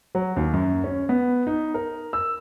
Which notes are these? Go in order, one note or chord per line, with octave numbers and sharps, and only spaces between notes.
F#3
D#2
F#2
C#4
B3
D#4
A#4
E6